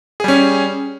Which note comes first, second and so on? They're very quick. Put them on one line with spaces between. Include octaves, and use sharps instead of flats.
G#4 G3 C#4